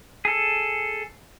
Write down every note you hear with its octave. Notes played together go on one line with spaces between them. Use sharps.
G#4 A4